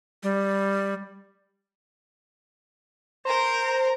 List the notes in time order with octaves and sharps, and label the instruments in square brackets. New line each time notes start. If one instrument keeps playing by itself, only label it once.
[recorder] G3
[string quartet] A#4 A#5 [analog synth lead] C5